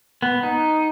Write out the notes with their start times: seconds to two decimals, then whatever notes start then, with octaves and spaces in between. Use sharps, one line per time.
0.22 B3
0.43 D#4